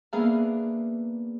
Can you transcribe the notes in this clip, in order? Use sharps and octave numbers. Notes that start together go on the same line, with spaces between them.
A#3 B3 D4 G#4 E5 F5